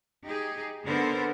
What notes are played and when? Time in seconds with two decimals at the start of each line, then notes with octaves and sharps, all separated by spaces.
0.24 D#4 G4 G#4
0.85 D3 B3 A4 A#4 C5